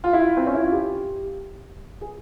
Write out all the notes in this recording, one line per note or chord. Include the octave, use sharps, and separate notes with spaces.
F4
E4
F4
C4
C#4
E4
F4
G4
G#4